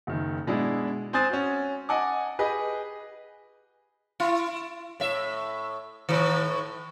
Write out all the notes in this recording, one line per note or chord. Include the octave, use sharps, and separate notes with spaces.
F#1 D#3
B2 G#3 D4 E4
C4 C5 G#5 D#6 F#6 A6
C#4 F#4
D#5 F#5 G#5 A5 D6
G4 G#4 B4 D#5
E4
A2 E5
A2 D#3